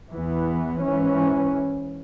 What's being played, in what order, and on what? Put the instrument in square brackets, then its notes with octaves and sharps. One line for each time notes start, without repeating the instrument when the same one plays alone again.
[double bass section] E2 E3 B3
G#2 E3 C#4